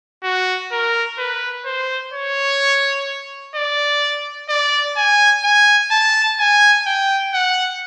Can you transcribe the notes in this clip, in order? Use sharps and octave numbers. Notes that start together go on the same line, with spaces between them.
F#4
A#4
B4
C5
C#5
D5
D5
G#5
G#5
A5
G#5
G5
F#5